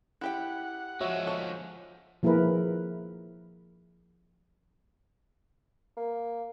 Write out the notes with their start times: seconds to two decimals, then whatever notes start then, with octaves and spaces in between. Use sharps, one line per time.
0.21 E4 G4 F#5 G5
1.01 F3 G#3 F#4 C#5 E5
1.27 A4 C#5
2.23 F3 A#3 E4 G#4 A#4 B4
5.97 A#3